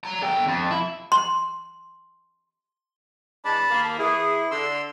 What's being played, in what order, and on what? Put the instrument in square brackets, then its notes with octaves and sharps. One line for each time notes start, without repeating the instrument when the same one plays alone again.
[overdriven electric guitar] C#5 A#5
D3 G5
F2
E4
[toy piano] C6
[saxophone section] E3 G#3 D4 [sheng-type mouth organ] A5 B5
[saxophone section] D#2 A#3
[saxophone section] E3 G#4 [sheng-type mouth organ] E4
[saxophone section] D3 [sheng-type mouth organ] C6 E6